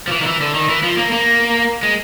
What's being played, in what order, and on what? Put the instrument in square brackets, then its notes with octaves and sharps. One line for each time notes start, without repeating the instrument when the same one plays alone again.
[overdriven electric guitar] F3
E3
D#3
E3
D3
D#3
E3
F3
A#3
A#3
G#3